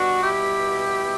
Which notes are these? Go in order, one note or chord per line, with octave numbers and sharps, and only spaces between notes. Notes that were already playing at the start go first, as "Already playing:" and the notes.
Already playing: B2 G3 B3 D4 F#4
E4 G4